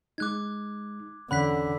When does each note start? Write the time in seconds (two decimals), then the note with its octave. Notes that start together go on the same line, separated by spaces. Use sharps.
0.18 G#3 D#4 D6 F#6 G#6
1.31 E2 D3 C#4 F#5 B5 F#6 B6